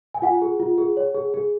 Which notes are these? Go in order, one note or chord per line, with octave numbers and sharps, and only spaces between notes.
G#5
F4 F#5
G#4
F4
G#4
C#5
G#4
G#4